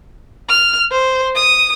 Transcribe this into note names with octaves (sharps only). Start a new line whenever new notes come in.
F6
C5
D#6